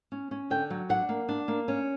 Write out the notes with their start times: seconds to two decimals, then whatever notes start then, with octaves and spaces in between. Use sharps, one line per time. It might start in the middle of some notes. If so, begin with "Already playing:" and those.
0.12 C#4
0.31 C#4
0.50 D3 G5
0.70 F#3
0.89 D4 F#5
1.09 A#3
1.29 D4
1.48 A#3
1.68 C#4